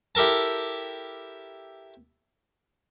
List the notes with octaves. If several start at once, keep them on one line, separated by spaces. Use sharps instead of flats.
E4 G4 A4 A#4 A5